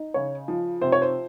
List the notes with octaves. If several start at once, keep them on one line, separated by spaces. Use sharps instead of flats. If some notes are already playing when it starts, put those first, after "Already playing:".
Already playing: D#4
C#3 C#5
F3
C3 C5
C#5
C5